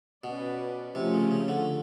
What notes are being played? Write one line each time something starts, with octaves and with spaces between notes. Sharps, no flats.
B2 C#4 F#4 B4 D5
C3 F3 A3 C#4 F4
C#3
C#3
D3